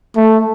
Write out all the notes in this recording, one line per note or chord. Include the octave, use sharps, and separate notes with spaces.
A3